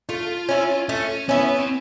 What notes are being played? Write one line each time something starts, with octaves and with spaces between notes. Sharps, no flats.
A3 F4
C#4 E4
A3 C#4
B3 C#4 E4
C4